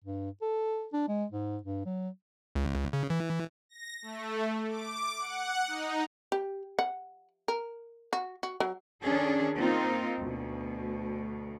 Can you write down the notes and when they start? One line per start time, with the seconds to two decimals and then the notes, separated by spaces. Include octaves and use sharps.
0.04 G2
0.42 A4
0.93 D4
1.08 G#3
1.32 G#2
1.63 G2
1.86 F#3
2.55 C#2
2.93 C#3
3.10 E3
3.69 A#6
4.02 A3
4.68 D6
5.19 F#5
5.67 D#4
6.32 G4
6.79 F#5
7.48 A#4
8.13 F#4
8.43 F#4
8.60 F#3
9.03 D#3 C#4 D4 G#4 A4
9.55 A#3 C4 D#4 F4
10.18 D2 B2